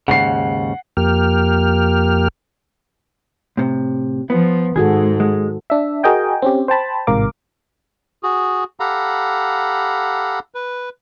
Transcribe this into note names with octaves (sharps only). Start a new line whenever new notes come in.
D#2 G#2 C#3 F#5 C7
F2 A#3 G4 F6
A2 C3
F3 B3
G#2 D#3 F#4 G#4 A4
G#3
D4 E5
F#4 G#4 A#4 D#5 G5 G#5
C4 C#4 G4
C5 G5 A5 B5
A1 G#2 C3 A#4 F5 D6
F#4 G#4
G4 A4 F5 F#5 A#5 B5
B4